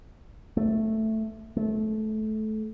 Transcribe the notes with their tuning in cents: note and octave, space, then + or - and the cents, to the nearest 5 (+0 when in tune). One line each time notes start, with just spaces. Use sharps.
A3 +0
A3 -20